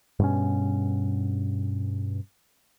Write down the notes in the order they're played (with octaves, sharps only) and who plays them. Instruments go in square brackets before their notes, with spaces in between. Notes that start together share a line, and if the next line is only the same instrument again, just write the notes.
[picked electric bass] G2 B2 C#4